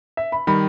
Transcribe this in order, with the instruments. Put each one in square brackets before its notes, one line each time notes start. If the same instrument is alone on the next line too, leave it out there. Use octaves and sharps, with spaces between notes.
[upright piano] E5
B5
[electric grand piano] D#3 G3 [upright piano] B5